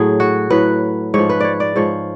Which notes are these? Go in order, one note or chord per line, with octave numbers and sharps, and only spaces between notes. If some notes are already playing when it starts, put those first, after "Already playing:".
Already playing: A2 F#3 G#4
F#4
A2 F#3 B4
G#2 F3 C#5
B4
C#5 D5
D5
G#2 F3 C#5